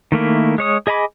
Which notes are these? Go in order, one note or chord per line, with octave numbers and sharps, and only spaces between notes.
D#3 A3 A#3 E4
G#3 C#5 D#6
G#4 D#5 G#5 B5 D6